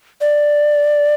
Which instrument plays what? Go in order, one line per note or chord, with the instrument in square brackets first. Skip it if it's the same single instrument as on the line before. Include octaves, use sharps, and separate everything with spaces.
[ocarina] D5